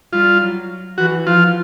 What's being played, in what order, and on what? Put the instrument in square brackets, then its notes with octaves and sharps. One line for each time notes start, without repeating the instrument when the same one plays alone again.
[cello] G3 [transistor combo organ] F4
[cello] F#3
[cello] E3 [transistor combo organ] F#4
[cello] F3 [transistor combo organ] F4